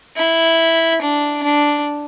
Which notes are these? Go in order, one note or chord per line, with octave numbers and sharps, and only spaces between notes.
E4
D4
D4